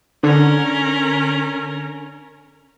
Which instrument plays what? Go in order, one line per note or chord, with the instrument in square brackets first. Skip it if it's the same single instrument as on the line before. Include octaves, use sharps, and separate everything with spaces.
[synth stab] D3 [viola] C#4 A#4